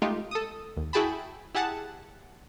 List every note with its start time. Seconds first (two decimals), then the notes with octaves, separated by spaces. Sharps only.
0.02 G#3 A3 D#4 F4 G4
0.31 A4 D#6
0.77 D#2
0.93 E4 F#4 G#4 G5 A5 B5
1.55 E4 G4 G#4 F#5 A5